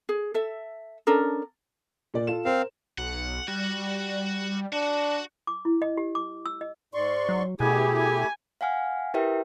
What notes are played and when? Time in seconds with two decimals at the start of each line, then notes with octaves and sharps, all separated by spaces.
0.09 G#4
0.34 A4 E5
1.07 C#4 D4 A4 A#4
2.14 A#2 A#3 D5
2.27 F4 A4 E7
2.45 C4 A#4 C5 F5
2.98 B1 F#5
3.48 G3 F#4 F#5
4.73 D4 F#4
5.47 D6
5.65 E4
5.82 D#5
5.97 G4
6.15 D6
6.46 E6
6.61 D#5
6.94 G#2 D5 C6 C#6
7.29 F#3
7.60 B2 A3 E4 G4 G#4 G#5
7.97 G#5
8.61 F5 F#5 G#5 F6
9.14 E4 G4 A#4 B4 E5 G5